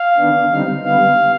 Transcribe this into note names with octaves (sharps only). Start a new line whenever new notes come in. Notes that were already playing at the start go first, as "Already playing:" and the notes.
Already playing: F5
D#3 B3 D4
D3 G3 C4 D#4
D3 G3 B3 F5